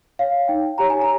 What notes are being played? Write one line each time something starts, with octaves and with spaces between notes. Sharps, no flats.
C#5 F5
D#4 G5
G4 C#5 A#5
G#5
A#5